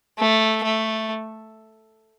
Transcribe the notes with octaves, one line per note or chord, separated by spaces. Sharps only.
A3
A3